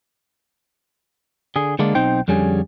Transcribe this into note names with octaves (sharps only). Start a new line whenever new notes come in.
D3 G#4
D3 G#3 A#3 D4
B1 C4 D#4 C5 G5
F2 D3 G3 C#4 G#4